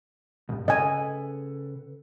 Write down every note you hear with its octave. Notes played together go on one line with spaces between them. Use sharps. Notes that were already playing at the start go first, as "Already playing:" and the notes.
B1 G2
C#3 A4 B4 D#5 G#5